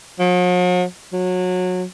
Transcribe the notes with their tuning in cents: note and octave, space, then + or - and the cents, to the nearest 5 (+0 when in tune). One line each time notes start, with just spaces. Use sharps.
F#3 -45
F#3 -25